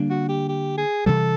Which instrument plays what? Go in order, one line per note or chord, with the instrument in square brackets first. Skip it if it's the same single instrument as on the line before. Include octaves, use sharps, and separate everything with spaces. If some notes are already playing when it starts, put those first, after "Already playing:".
Already playing: [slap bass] D3 G3 A#3 D4
[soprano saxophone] F#4
G4
G4
G#4
[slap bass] C3 E3 G3 [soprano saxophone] A4